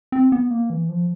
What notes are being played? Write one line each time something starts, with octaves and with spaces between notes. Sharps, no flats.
C4
B3
A#3
E3
F3